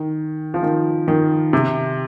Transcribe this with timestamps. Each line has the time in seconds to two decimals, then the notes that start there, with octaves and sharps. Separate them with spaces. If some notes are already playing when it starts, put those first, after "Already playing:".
Already playing: D#3
0.54 F3
0.63 D#3
1.08 D#3
1.53 C3